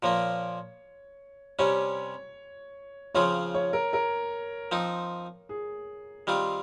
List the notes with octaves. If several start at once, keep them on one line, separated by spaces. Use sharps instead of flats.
A#2 F3 A#3 C#5
C3 G3 C#4 C#5
C#3 F3 C4 F4 C#5
C#5
A#4
A#4
F3 C4 D#4
G#4
D#3 G3 C4 F4